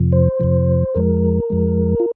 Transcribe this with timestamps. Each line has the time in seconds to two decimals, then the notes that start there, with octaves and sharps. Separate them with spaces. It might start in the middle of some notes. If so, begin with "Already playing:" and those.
Already playing: F2 C3 F3
0.12 C5
0.40 F2 C3 F3
0.95 F2 F3 G#3 A#4
1.50 F2 F3 G#3
2.00 F4